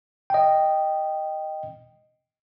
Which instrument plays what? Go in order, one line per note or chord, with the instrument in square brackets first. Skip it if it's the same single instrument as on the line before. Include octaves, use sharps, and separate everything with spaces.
[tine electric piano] D#5 G5